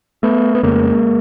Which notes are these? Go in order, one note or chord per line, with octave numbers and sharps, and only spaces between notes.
A3 B3
B3
F2 C#3 G#3 A#3